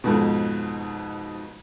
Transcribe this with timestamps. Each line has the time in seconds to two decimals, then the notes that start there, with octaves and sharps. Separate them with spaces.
0.04 F2 G#2 B2